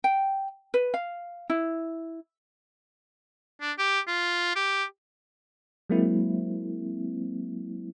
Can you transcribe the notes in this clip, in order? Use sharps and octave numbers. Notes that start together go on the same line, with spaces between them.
G5
B4
F5
E4
D4
G4
F4
G4
F#3 G#3 A#3 C4 E4